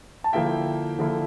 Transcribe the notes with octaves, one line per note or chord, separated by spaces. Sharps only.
A5
D3 F3 A#3 E4 E5 G5
D3 F3 A#3 E4